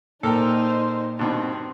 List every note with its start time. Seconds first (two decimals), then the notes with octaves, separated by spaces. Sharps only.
0.23 A#2 D#4 A4 A#4 C5 G5
1.19 G2 B2 D#3 C4